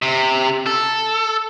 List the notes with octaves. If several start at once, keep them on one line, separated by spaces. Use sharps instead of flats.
C3
A4